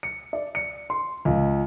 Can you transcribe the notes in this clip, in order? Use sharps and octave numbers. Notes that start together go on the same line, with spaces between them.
C#7
D5
C#7
C6
C#2